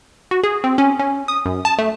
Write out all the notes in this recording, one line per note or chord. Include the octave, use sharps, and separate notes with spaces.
F#4
G#4
C4
C#4
C#4
D#6
F#2
A5
A3